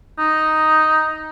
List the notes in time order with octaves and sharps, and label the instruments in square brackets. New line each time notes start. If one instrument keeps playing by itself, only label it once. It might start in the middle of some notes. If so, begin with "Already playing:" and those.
[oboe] D#4